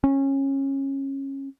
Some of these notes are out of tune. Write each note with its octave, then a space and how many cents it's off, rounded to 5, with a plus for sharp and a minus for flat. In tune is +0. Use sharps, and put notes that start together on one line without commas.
C#4 -25